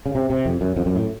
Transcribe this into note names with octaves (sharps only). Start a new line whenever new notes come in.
C#3
C3
C3
F2
F#2
F2
F#2
A2